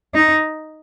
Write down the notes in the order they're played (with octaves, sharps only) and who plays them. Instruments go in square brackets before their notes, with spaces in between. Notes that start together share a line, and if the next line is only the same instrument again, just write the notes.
[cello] D#4